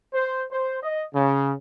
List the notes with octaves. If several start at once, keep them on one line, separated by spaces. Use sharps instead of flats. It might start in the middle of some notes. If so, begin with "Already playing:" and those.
C5
C5
D#5
C#3